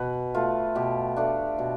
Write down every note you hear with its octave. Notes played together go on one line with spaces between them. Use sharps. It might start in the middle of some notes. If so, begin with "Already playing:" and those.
Already playing: B2 B4
A3 F4
B2 G4
A3 D4
B2